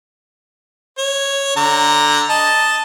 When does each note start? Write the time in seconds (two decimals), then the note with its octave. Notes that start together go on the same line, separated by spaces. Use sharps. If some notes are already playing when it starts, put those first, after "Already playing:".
0.98 C#5
1.57 D3 A#5
2.30 D#5 A5